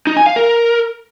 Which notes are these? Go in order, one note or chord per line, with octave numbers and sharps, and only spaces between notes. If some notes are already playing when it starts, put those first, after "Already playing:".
D#4
G#5
F5
A#4